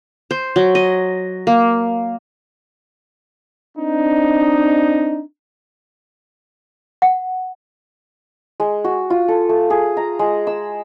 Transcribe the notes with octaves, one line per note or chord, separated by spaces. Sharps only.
C5
F#3
D#5
A#3
C4 D4 D#4
F#5
G#3
F#4
F4
A4
A3
G#4
A#5
G#3
E6